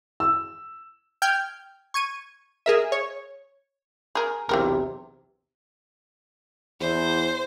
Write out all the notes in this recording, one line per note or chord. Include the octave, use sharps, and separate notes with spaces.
E6
G5 F6 G6 G#6
C#6 G#6 D#7
G#4 A#4 E5
C#5
G#4 A#4
B1 E2 C3 E3 C4 A#4
E2 C5